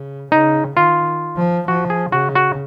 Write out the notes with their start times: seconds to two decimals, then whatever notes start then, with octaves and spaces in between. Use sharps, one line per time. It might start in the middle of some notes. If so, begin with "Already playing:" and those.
Already playing: C#3
0.31 C#3 D#4
0.77 D#3 F4
1.37 F3
1.68 F3 F#4
1.90 G#4
2.12 C#3 F#4
2.35 F#4